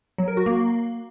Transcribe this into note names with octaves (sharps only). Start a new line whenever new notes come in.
F#3
A#4
F#4
A#3